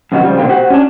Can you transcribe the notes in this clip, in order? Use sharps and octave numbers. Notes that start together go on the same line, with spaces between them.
F#2 C3 D#3 F#4
C#3 F3 G3
B2 D3 A#3 C4
F#4 G4 C5 F#5
C#4 D4